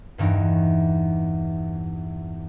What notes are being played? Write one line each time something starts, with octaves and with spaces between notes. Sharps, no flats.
E2 G2 E3 D#4